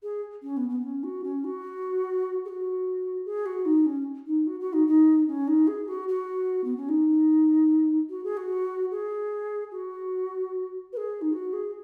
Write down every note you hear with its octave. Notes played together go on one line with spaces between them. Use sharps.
G#4
C#4
B3
B3
C#4
F#4
C#4
F#4
G#4
F#4
G#4
F#4
D#4
C#4
D#4
F#4
F#4
D#4
D#4
C#4
D#4
G#4
F#4
F#4
B3
C#4
D#4
F#4
G#4
F#4
G#4
F#4
B4
G#4
D#4
F#4
G#4